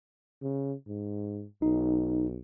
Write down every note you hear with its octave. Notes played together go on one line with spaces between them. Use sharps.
C#3
G#2
B1 D#4